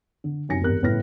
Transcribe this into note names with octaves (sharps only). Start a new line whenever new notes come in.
D3
F#2 C3 D#4 G#5 A#6 C#7
G#1 E2 G2 A#4 F#6
G1 A2 C#3 B4 F6 A#6